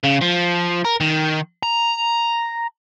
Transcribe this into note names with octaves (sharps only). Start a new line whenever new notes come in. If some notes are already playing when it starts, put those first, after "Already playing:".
C#3
F3
A#4
D#3
A#5